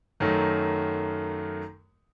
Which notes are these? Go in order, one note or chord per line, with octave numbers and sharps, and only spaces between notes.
F#2 D#3 F#3 A3